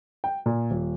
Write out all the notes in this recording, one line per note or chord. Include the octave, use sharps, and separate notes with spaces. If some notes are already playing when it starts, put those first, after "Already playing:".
G5
A#2
D#1